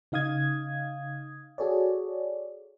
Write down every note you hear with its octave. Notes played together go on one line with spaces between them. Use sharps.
C#3 D#4 F5 D#6 G#6
F#4 G#4 A4 C#5 D5